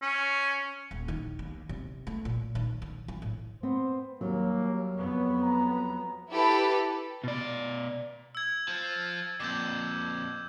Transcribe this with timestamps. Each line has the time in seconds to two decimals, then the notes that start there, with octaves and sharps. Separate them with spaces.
0.02 C#4
0.91 D#1
1.08 D#3
1.39 D#2
1.69 C3
2.07 A3
2.25 A#2
2.55 D#3
2.82 D#3
3.08 E3
3.22 A2
3.63 B3 C4 C5
4.21 D#2 F#3 G3 A#3
4.96 F2 B3 C#5
5.42 A#5
6.31 E4 G4 A4 B4
7.24 B2 D5
8.35 E6 G#6
8.68 F3
9.40 F2 A#2 D6 E6 G6